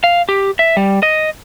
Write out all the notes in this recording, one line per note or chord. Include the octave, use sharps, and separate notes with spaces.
F5
G4
E5
G3
D#5